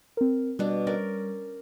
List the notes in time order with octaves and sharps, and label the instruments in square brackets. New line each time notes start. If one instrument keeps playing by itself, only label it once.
[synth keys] C4 A#4
[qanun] B2 D4 [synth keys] G3
[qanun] C#4 A#4 D5